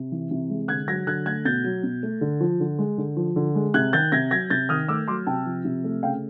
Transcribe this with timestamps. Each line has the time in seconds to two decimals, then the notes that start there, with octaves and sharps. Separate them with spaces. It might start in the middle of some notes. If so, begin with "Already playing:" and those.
Already playing: C3
0.12 E3
0.31 C3
0.50 G#3
0.68 D3 F#6 G#6
0.88 F#3 G#6 A#6
1.07 D3 F#6 G#6
1.26 A3 F#6 G#6
1.45 B2 G6 A6
1.64 F#3
1.83 B2
2.03 A3
2.21 D3
2.41 F3
2.60 D3
2.79 G#3
2.98 D3
3.17 F3
3.36 D3
3.55 G#3
3.74 C3 F#6 G#6
3.93 D#3 G6 A6
4.12 C3 G#6 A#6
4.31 F#3 G#6 A#6
4.50 C3 G6 A6
4.69 D#3 D#6 F6
4.88 A3 D6 E6
5.08 F#3 C6 D6
5.27 C3 G5 A5
5.46 F3
5.65 C3
5.84 A3
6.03 C#3 F5 G5